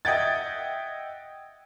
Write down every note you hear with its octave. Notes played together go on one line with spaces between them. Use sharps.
D#5 E5 F#5 G5 G#6 A6